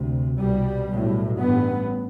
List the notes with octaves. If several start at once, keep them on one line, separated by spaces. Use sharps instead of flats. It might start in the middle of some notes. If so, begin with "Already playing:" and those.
Already playing: D2 C3
C2 B2 G3
B1 A2
A1 G2 B3